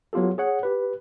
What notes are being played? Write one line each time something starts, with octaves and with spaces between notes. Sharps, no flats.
F#3 B3 F4 G4 A4
G#4 C#5 F#5
G4 B4